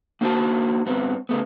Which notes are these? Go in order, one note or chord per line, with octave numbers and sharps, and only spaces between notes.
A#3 D4 F#4 C5 D5 A5
G2 B3 C4
C#3 A3 B3